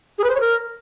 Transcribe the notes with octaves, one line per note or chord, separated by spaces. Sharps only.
G#4
B4
C5
C#5
A#4